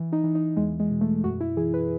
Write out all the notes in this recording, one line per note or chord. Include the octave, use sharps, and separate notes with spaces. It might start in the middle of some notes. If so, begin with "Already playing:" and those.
Already playing: E3
D#4
E3
D#4
E2 G#3
G#3
B2
A3
F#2 F#4
E4
E3 G#4
B4